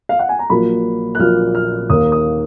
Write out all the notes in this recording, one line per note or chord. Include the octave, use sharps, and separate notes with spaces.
F5
F#5
G#5
A#5
A#1 A#2 F#3 A#3 B5
F#6
A#1 A#2 F#3 A#3 F6
F6
D#2 D#3 A#3 D#6
D#6